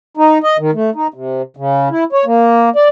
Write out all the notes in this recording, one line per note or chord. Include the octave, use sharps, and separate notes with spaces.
D#4
D#5
D#3
A3
D#4
C3
C#3
E4
C#5
A#3
D5